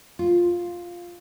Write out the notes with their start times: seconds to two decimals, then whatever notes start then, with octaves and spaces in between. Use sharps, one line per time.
0.19 F4